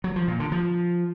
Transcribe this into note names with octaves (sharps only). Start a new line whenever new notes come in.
F#3
F3
A#2
D3
F3